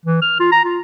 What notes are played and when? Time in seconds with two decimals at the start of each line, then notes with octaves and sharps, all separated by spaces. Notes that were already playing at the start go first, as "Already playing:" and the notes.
0.05 E3
0.22 F6
0.39 F4
0.52 A#5
0.64 F4